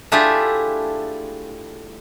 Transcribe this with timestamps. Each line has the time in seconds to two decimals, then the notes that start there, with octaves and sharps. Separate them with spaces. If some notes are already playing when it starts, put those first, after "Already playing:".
0.12 A3 D4 E4 F4 G4 G#4